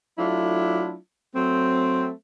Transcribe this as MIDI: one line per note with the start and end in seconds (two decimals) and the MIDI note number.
0.18 0.96 54
0.18 0.96 57
0.18 0.96 62
0.18 0.96 64
0.18 0.96 65
1.35 2.11 54
1.35 2.11 57
1.35 2.11 60